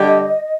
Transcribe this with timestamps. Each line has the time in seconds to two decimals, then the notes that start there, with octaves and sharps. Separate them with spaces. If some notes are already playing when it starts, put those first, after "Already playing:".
Already playing: D3 G3 D4 G4 D#5